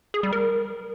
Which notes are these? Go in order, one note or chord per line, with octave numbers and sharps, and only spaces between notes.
G#4
G3
A#4